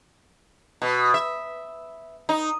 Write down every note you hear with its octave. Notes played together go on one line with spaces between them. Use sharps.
B2
E5
D#4